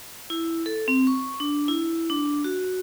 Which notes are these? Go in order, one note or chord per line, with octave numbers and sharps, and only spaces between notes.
E4
A4
C4
C#6
D4
E4
D4
F#4